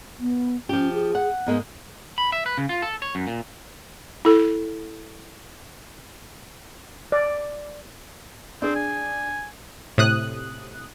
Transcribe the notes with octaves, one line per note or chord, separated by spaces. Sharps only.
B3
F3 C#4 G4
G#4
F#5
G#2 G#3 A#3 B3
B5
E5
B4
C#3
F4
A4
C#5
F#2
A#2
E4 A4
D5
C4 D4 G#4
G#5
A2 C3 D#6 F#6